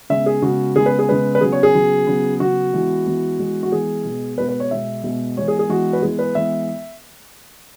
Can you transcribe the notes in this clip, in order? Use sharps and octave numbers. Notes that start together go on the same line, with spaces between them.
C#3 G#3 B3 E5
G#4
C#3 G#3 B3 F#4
C#3 G#3 B3 G#4
B4
G#4
C#3 G#3 B3 B4
B4
C#3 F#3 B3 G#4
C#5
G#4
C#3 F#3 B3
C#3 F#3 B3
C#3 F#3 B3 F#4
E3 G#3 B3
E3 G#3 B3
E3 G#3 B3
F#4
E3 G#3 B3 G#4
B2 G#3 B3
B2 G#3 B3 B4
B4
C#5
B2 G#3 B3 E5
B2 G#3 B3
E3 G#3 B3 C#5
G#4
G#4
E3 G#3 B3 F#4
B4
E3 G#3 B3 G#4
B4
E3 G#3 B3 E5